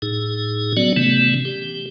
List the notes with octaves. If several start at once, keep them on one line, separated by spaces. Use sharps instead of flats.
A2 D#4 G#4
F#3 B3 C#4 F#4 D5
C3 E3 A3 B3 C#4
G4